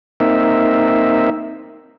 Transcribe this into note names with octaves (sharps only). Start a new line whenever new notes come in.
A#3 C4 D#4 E5